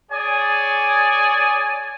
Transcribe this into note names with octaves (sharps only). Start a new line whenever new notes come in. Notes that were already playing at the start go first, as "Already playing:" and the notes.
G#4 C#5 D5 G#5